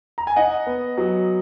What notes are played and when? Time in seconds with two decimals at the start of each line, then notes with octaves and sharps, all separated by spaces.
0.18 A#5
0.27 G#5
0.36 D#4 D#5 F#5
0.66 B3
0.98 F#3